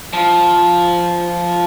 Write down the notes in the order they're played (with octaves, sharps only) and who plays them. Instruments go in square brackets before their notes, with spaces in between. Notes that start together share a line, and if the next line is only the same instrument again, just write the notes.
[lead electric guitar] F3